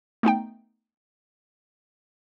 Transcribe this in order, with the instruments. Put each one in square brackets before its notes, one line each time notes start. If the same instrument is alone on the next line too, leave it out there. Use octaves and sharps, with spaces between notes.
[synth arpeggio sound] A3 B3 D#4 G5